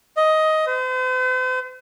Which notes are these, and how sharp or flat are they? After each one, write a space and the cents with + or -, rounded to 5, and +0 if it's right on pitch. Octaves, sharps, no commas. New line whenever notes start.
D#5 +10
C5 -45